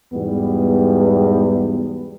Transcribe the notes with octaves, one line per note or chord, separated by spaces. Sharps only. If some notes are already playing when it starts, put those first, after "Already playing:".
E2 G#2 B2 G3 B3